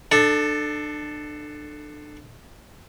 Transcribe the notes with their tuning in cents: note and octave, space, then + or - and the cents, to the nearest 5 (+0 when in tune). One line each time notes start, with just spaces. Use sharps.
D4 +30 A4 +0